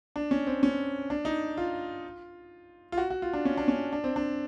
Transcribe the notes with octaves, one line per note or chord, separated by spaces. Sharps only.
D4
C#4
C4
C#4
D4
D#4
F4
F4
F#4
F#4
F4
D4
C#4
D4
C#4
D4
C4
D4